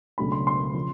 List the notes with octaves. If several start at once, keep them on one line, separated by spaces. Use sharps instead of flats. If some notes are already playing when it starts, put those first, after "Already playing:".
C#2 B2 F#3 A3 D4 B5
C6
C6
C#3 F3